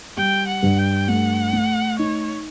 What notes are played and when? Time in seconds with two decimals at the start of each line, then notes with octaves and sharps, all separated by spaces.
0.17 G3 G5
0.48 F#5
0.63 G2
0.78 G5
1.08 A3 F#5
1.53 A3
1.99 D#4 C#5